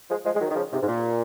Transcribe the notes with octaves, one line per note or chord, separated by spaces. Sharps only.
F3 G#3
F3 G#3
G#3
D#3 F#3
D#3
C#3 F3
G#2 C3
G#2
A#2